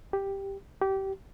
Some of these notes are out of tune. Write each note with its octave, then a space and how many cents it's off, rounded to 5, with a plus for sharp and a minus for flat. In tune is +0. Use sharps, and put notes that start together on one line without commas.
G4 +5
G4 -20